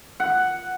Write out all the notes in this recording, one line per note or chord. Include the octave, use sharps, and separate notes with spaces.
F#5